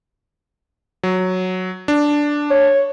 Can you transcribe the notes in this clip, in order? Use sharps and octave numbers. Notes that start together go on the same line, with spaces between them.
F#3
D4
C#5